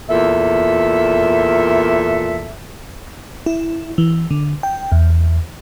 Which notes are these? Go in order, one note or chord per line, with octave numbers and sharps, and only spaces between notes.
E2 A#2 A4 E5
E4
E3
D3
G5
E2